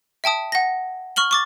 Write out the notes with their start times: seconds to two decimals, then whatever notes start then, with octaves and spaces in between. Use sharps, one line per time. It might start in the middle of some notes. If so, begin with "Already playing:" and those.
0.24 E5 G5 A5 D#6
0.52 F#5 A#6
1.16 C#6 F6 F#7 G7
1.31 C#6 D6 A6